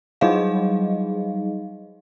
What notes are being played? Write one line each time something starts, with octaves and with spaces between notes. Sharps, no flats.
F#3 G3 D#4 G#4 D#5 F5